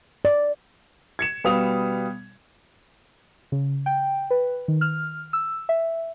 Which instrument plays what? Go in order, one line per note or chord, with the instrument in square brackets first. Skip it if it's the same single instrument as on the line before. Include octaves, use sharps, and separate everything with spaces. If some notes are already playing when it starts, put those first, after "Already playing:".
[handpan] D5
[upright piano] G#6 C#7 E7
B2 G3 B3 F5 D#6 F7
[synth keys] C#3
G5
B4
D#3
F6
E6
E5